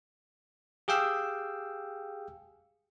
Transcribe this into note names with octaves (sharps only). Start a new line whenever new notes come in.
G4 G#4 F5 G5 E6